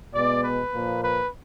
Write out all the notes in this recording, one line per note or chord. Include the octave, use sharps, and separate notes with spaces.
B2 G#3 B3 D5
B4
A#2 F3 A#3
B4